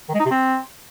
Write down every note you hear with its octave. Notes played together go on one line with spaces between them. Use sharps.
D#3
G#3
D#4
C3
C4